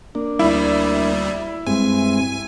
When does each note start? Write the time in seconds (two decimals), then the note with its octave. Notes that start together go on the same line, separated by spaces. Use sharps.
0.15 A#3 D4
0.39 D2 G3 E4
1.67 G2 G#3 C4 G#5